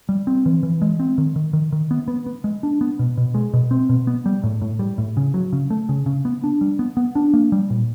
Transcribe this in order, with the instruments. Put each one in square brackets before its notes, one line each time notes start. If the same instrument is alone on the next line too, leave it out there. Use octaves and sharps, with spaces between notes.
[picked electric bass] G3
C4
E3
E3
G#3
C4
D#3
D#3
D#3
D#3
B3
B3
B3
G#3
D4
B3
B2
B2
G#3
B2
C4
B2
B3
G3
A2
A2
G3
A2
C#3
F#3
C#3
A3
C#3
C#3
B3
D4
G3
B3
B3
D4
A#3
G3
A#2